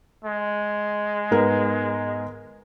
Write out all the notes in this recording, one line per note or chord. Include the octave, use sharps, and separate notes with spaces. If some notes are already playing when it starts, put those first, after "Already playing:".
G#3
G#2 B3 A#4